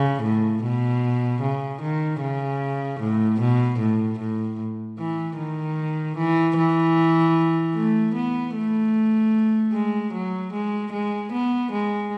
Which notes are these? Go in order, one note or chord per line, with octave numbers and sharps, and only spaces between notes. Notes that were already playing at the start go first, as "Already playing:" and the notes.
Already playing: C#3
A2
B2
C#3
D#3
C#3
A2
B2
A2
A2
E3
D#3
E3
E3
A3
B3
A3
G#3
F#3
G#3
G#3
B3
G#3